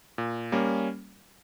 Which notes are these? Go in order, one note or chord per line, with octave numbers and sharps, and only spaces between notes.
A#2
G3 A#3 C#4